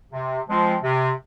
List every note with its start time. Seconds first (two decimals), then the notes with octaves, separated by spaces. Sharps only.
0.12 C3
0.47 F3 G#3 C4 F4
0.83 C3